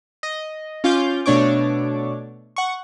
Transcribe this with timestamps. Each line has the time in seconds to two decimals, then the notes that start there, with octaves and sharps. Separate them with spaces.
0.23 D#5
0.84 C#4 F4 F5 D6 G6
1.26 B2 A3 D4 C#5 C#6 D6
2.56 F#5 C#6